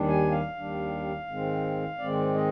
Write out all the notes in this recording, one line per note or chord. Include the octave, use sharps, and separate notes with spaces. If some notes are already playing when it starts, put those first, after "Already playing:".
Already playing: D#2 D#3 G3 D4
G#5
F5
D#2 D#3 G3 D4
G#2 D#3 G#3 C4
G#2 D#3 G#3 C4 D5
D#5